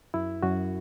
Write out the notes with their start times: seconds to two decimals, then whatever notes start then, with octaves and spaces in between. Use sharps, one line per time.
0.14 F#2 E4
0.43 F#2 F#4